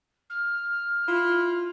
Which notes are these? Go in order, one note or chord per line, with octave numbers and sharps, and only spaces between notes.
F6
E4 F4